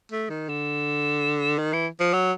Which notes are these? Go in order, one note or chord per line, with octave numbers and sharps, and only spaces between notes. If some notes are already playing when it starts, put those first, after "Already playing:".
A3
D#3
D3
D#3
E3
F3
F#3